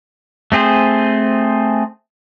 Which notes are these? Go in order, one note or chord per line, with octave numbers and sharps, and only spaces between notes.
A3 C4 G#4 C5